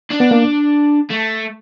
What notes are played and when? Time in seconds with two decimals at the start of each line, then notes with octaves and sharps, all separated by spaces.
0.11 D4
0.20 B3
0.31 A#3
1.10 A3